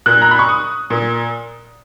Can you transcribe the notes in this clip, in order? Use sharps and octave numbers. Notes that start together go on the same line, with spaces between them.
A#2 F#6
A#5
B5
C#6
D#6
A#2